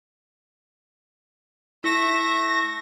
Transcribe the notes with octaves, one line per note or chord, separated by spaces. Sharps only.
A3 E4 E5 A#6 C#7 E7